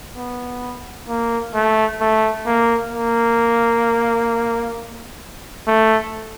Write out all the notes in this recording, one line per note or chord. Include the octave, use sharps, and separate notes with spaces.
B3
A#3
A3
A3
A#3
A#3
A3